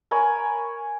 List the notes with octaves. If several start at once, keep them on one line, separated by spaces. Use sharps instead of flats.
A#4 C#5 G#5 B5